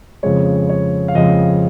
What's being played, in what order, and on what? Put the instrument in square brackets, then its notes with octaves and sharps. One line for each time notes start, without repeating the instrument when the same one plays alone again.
[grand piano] F2 C#3 F3 G#3 C#5
C#5
F5
F2 C#3 F3 G#3 D#5